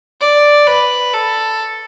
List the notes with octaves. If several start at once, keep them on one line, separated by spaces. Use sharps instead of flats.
D5
B4
A4